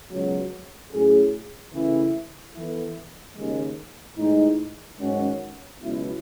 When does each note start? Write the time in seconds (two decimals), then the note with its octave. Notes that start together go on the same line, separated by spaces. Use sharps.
0.09 C#2 B2 F#3
0.91 A2 F#3 C#4 G#4
1.72 C#3 E3 A3 E4
2.53 E3 B3 E4 A4
3.35 D#2 C#3 G#3
4.16 A2 E3 G#3 D#4
4.98 G#2 D#3 F#3 C#4 F#4
5.80 C#2 B2 F#3 B3 E4